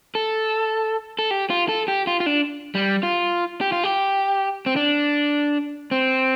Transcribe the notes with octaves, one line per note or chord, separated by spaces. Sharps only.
A4
A4
G4
F4
A4
G4
F4
F4
D4
G3
F4
G4
F4
G4
C4
D4
C4